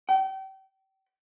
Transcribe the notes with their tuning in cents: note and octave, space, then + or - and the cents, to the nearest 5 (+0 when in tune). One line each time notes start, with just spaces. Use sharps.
G5 -35